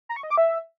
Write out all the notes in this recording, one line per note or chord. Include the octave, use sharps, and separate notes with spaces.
A#5
C#6
D#5
D6
E5